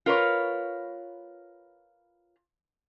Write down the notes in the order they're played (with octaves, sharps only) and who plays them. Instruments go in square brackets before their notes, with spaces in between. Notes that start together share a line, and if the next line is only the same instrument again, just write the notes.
[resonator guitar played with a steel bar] F4 A#4 B4 C#5